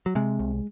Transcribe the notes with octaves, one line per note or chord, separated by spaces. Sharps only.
F#3
C3 G#3
C2